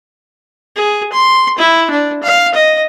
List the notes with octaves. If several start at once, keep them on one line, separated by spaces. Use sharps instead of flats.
G#4
C6
E4
D4
F5
D#5